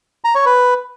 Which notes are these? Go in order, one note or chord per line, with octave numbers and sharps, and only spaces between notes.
A#5
C#5
B4